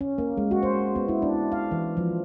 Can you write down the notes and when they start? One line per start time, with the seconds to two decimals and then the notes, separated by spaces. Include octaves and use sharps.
0.01 C#4
0.18 A#3
0.37 G#3
0.51 F#4
0.63 C5
0.96 B3
1.08 E4
1.22 D4
1.52 F5
1.72 E3
1.97 F3